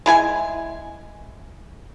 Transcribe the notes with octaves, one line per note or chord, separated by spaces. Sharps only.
G#3 E4 G#5